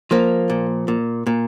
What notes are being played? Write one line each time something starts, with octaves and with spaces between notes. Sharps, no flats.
F3 A#3
A#2
A#2
A#2